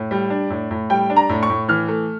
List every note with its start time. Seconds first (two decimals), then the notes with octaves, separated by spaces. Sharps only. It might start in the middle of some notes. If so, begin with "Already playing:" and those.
Already playing: A2
0.11 G3
0.30 D4
0.50 A2
0.71 A2
0.90 G3 G5
1.10 D4
1.16 A#5
1.29 A2
1.43 C#6
1.50 A2
1.68 E3 F6
1.88 A3